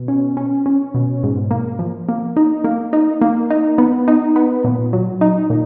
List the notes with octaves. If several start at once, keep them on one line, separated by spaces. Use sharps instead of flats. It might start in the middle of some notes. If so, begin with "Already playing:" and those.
Already playing: B2
C#4
C#4
C#4
B2
G#2
A#3
F3
A#3
D#4
A#3
D#4
A#3
D#4
B3
D#4
B3
A#2
F#3
D#4
A#2